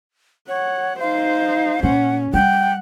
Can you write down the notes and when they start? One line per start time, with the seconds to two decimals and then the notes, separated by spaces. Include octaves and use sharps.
0.48 C#5 F#5
1.00 D#4 C5 F5
1.83 A#2 C#4 F#5
2.34 G3 F#5 G5